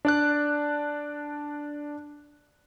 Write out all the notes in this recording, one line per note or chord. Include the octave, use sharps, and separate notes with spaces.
D4 D5 F#6